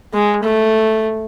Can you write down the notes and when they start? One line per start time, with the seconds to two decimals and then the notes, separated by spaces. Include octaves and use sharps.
0.14 G#3
0.43 A3